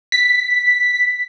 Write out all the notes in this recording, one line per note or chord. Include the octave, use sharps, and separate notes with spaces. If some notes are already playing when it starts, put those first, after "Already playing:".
B6